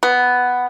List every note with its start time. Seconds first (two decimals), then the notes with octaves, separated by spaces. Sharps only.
0.03 B3